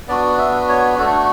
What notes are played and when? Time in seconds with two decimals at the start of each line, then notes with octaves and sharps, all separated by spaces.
0.08 B3 D4 F#4 D5
0.38 E5
0.69 C#5
0.99 A3 D4 F#4 A4